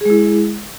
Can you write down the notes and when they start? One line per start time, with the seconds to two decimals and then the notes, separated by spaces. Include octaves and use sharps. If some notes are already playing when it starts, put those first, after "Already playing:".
0.01 G#4
0.05 G#3
0.10 E4